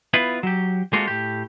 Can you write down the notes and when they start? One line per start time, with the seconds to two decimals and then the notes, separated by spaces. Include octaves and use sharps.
0.14 B3 E4 F4 B4
0.43 F#3 G4
0.93 G#3 A#3 C4 F4 F#4 A4
1.07 A2 G4